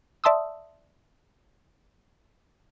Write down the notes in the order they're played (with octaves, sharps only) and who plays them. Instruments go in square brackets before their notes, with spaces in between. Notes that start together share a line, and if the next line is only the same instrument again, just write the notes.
[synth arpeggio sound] D5 E5 A5 C6 D#6 E6